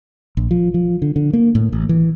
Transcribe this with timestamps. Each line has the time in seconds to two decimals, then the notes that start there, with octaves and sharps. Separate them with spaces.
0.37 A#1
0.51 F3
0.74 F3
1.02 D3
1.16 D3
1.33 A#3
1.55 A2
1.72 A1
1.89 E3